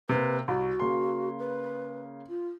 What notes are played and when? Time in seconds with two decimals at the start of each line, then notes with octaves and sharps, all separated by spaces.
0.09 C3 A#3 B4
0.48 C2 F#4
0.80 C#3 A#3 C6
1.39 B4
2.29 F4